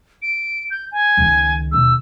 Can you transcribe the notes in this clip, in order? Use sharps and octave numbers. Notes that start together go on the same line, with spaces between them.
D7
G6
G#5
C#2 D#3
D#2 B2 E6